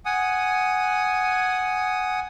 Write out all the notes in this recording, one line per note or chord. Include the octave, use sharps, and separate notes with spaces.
F#5 G#5 D#6